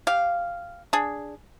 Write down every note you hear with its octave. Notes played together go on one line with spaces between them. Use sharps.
G4 F5
D4 G#4